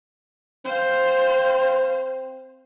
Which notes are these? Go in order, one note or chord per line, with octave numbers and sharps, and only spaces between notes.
C4 C5 F5